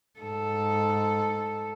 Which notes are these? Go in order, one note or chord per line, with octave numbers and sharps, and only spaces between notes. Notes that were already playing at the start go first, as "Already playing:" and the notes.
G#2 A4